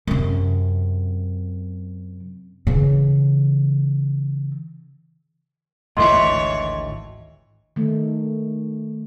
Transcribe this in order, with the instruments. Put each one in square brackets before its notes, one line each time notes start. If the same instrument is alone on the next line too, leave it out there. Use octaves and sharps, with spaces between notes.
[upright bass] F#2 C3
C#3 E3
[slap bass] G#1 D2 A2 [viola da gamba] E3 C#5 [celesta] D#5 [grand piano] C6
[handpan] D#3 A3